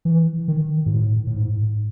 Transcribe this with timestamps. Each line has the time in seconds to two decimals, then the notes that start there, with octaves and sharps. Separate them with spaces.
0.05 E3
0.48 D#3
0.86 G#2
0.93 A2
1.27 A2
1.36 G#2